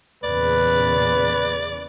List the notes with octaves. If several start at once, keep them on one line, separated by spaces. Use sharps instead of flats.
E2 A#2 C#3 B4 D5